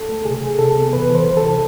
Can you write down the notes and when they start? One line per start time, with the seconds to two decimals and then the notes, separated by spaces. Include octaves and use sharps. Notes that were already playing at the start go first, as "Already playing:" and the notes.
Already playing: A4
0.09 A3
0.25 C3 G#4
0.42 C3
0.59 C3 A4
0.76 B3
0.93 E3 B4
1.09 E3
1.15 C5
1.26 C2
1.37 A4
1.43 C3